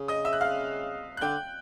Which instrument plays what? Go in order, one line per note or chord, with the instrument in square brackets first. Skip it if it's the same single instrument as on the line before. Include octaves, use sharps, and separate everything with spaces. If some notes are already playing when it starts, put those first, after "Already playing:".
Already playing: [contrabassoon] C#3
[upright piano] D#5 D#6
E5 E6
F#6
F5 F6
F#6
[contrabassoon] D3 [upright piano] G5 G6